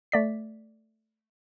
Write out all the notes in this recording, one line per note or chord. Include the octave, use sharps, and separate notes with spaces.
A3 D5 B6